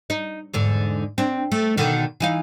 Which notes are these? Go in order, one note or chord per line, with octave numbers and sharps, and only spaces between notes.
D#4
E2 G#2 D3
C4 D4
A3
B2 D3 D#3
E3 D#4 F5